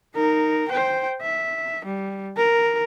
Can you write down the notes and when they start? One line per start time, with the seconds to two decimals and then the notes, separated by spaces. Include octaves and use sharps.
0.14 D#4 A#4
0.69 C5 G5
1.22 E5
1.85 G3
2.37 A#4